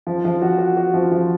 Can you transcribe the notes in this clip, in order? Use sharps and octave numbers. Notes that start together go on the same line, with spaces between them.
F3
F3
F#4
F#4
F#4
F3
F3